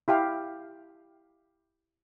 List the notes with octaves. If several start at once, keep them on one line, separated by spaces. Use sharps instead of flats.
E4 G4 F5 G5